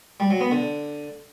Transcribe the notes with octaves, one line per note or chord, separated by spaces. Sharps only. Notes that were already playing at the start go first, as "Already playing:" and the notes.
G3
F#3
B3
D3